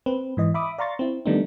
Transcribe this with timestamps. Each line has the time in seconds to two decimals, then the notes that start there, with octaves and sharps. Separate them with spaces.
0.06 C4 B4
0.37 G#2 E3 D#5
0.54 E5 B5 D6 D#6
0.78 D5 F5 A#5 C6 C#6 A6
0.99 C4 E4
1.26 D#3 G3 A3 B3 D4 D#4